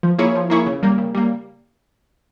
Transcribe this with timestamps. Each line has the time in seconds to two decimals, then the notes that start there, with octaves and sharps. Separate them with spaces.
0.03 F3
0.19 A#3 E4 G#4 C#5
0.35 F3
0.50 A#3 E4 G#4 C#5
0.67 C#3
0.83 G3 A#3
0.98 C#3
1.15 G3 A#3